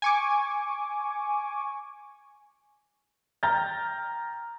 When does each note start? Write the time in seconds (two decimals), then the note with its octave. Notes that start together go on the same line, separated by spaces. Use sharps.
0.02 G#5 C#6 D6
3.43 G5 A#5 F6 G6 A6